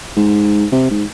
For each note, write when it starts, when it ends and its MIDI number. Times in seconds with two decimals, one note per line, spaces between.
0.17 0.65 44
0.72 0.90 48
0.90 1.04 44